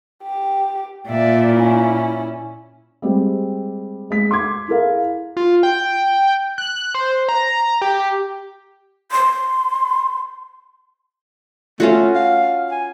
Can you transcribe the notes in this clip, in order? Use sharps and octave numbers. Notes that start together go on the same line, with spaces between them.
G4
A#2 D5 E5
C#4 E4
G3 G#3 C4 G4
G#3 B6
C6 D6 G#6
E4 G#4 A#4 F5
F4
G5
F#6
C5
A#5
G4
C6
A3 C#4 F4 F#4
F5
G#5